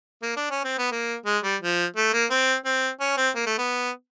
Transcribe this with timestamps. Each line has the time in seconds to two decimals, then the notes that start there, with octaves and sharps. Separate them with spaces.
0.22 A#3
0.37 D4
0.51 C#4
0.64 C4
0.78 B3
0.92 A#3
1.26 G#3
1.44 G3
1.61 F3
1.96 A3
2.13 A#3
2.30 C4
2.65 C4
3.00 C#4
3.17 C4
3.35 A#3
3.46 A3
3.58 B3